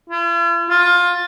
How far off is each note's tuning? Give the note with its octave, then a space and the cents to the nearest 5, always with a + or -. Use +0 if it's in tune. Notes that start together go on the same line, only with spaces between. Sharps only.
F4 -45
F4 +20